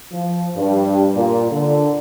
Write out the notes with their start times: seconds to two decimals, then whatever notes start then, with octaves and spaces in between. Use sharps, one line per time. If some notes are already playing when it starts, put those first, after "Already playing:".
0.12 F3
0.56 G2
1.14 A#2
1.51 D3